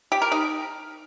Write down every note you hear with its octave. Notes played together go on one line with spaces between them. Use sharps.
G4
A#4
D#4